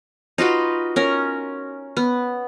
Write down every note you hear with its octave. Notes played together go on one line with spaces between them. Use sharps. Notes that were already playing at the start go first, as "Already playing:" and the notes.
D#4 F4 F#4 B4
C#4 A#4
B3